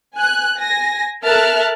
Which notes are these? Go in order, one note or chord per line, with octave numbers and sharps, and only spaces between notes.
G#5 F#6
G#5 A#6
A4 A#4 E5 A5 F6 F#6